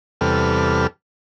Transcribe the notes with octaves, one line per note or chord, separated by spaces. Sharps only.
E2 C3 G3 A4 B4 F6